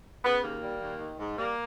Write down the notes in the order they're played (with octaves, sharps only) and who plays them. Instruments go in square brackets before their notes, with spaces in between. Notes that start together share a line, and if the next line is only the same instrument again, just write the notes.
[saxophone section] C#3 B3
D#2 A#3
G3
D#2
D#3
G#2
G3 A#3